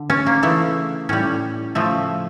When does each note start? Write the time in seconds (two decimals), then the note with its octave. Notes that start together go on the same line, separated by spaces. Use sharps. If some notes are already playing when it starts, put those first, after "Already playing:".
Already playing: D3
0.10 C#4
0.26 A#3
0.43 C#3 E3 A3
1.09 A2 G3 C#4
1.75 C#3 F3 A3